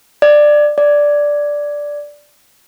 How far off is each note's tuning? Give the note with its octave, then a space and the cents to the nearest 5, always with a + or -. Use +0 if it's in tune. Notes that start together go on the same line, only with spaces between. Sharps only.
D5 +15
D5 -5